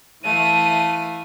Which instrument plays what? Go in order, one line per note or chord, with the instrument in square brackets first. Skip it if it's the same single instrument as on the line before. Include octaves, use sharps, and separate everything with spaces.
[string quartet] E3 A3 F5 [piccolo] D#7